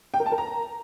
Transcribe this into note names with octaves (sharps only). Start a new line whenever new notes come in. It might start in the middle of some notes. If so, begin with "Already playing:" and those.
G5
A#4
A5
A#4
A#5